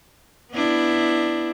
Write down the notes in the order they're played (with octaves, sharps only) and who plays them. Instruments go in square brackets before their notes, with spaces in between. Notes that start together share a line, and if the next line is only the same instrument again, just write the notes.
[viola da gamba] B3 D4 E4